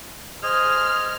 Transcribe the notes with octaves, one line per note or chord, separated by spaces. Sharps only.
G#4 C5 D#5 F6